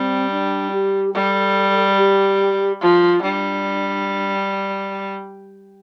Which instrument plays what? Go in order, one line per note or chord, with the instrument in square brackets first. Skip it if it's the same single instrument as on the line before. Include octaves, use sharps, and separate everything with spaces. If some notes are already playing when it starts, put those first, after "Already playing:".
Already playing: [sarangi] G3 [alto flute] C4
[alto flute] D4
G4
[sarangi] G3 [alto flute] A4
[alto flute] G4
[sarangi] F3 [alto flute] F4
[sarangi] G3 [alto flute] D4